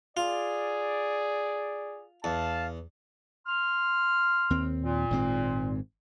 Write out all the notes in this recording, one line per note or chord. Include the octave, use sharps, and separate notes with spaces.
F4 G#4 D5
E2 F5 A5
C6 F6
D#2 C4
A#2
G#1 G#2 C4